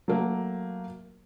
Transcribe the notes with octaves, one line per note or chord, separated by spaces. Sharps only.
F#3 A3 A#3